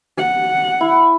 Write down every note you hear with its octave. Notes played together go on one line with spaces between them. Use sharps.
F#5
E4